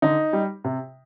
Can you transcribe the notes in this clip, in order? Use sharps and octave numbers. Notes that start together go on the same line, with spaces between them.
D3 D#4
G3
C3